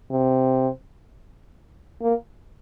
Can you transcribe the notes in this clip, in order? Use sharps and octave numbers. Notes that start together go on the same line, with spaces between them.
C3
A#3